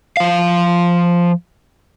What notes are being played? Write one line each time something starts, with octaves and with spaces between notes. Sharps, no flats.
F3 F5